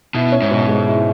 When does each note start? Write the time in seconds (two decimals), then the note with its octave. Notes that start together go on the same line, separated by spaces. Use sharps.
0.14 B2 E4
0.32 C#4
0.42 G#2
0.51 B2
0.68 G#3
0.86 E4